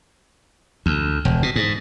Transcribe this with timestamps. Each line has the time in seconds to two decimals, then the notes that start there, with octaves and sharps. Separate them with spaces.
0.86 D2
1.25 E1
1.43 B2
1.56 G#2